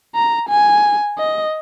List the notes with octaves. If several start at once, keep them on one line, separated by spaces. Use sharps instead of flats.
A#5
G#5
D#5